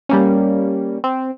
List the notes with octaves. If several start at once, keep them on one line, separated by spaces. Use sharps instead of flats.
G3 A#3 C#4
C4